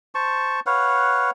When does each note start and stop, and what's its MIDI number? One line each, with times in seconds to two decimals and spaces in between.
0.15 0.60 72
0.15 0.60 81
0.15 0.60 85
0.66 1.30 71
0.66 1.30 73
0.66 1.30 77
0.66 1.30 78